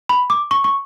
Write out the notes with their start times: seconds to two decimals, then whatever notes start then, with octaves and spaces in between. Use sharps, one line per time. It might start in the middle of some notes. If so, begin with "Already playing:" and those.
0.09 B5
0.30 D6
0.51 C#6
0.64 C#6